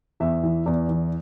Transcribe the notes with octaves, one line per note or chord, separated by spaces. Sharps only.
E2 E5
E3
E2 D5
E3